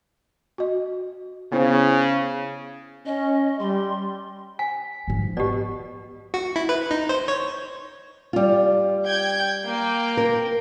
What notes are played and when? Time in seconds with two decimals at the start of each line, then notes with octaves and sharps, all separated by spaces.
0.58 F#4 D#5
1.52 C#3 B3 E4 C5
3.06 C#4 D#5
3.59 G3 C6
4.59 G#5 B6
5.08 G#2 F3
5.37 B2 G4 D5
6.34 F#4
6.56 E4
6.69 B4
6.91 D#4
7.09 C5
7.28 C#5
8.33 G3 F4
9.07 G5 G6 G#6
9.67 A#3 G5
10.17 A#4